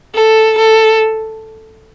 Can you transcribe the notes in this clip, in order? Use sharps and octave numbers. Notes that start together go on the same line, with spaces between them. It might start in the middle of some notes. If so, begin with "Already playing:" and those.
A4
A4